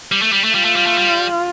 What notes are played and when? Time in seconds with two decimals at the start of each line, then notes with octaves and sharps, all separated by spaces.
0.12 G3
0.22 A3
0.32 G3
0.44 A3
0.55 G3 F4
0.65 A3
0.76 G3
0.87 A3
0.98 G3